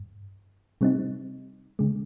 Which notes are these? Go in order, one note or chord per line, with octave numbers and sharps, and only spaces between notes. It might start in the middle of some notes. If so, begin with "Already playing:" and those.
Already playing: G2
C3 G3 C4 D#4
C#3 G#3